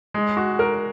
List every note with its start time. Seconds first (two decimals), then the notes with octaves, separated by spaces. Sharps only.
0.14 G#3
0.37 F#4
0.59 A#4